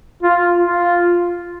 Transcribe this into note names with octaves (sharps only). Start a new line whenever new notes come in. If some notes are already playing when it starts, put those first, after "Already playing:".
F4
F4